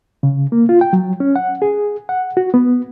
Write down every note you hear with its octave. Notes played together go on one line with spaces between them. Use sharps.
C#3
A#3
F4
G5
F#3
C#4
F#5
G#4
F#5
F#4
B3